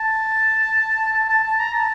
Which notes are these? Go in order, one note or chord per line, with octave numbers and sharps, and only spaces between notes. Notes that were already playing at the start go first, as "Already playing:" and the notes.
Already playing: A5
A5
A5
A5
A#5
A5